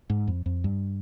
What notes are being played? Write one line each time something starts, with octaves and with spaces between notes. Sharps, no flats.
G#2
F2
F2
G2